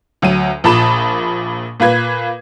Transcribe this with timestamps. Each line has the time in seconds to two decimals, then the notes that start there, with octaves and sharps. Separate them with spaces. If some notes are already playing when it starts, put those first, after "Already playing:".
0.22 D2 F#3 D#7
0.64 A#1 A#2 A5 B5 E7
1.80 A#2 F4 B4 G#6